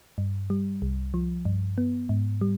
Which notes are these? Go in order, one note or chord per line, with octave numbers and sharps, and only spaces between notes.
G2
G3
C2
F3
G2
B3
G#2
G3